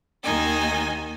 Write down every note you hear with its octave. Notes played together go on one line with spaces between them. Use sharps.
D#2 D#3 D#4 G#5